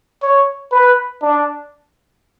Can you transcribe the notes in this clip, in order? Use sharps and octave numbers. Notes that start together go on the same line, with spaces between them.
C#5
B4
D4